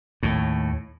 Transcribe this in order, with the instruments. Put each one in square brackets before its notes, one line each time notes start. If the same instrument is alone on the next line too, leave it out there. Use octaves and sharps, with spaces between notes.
[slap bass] D#2 A2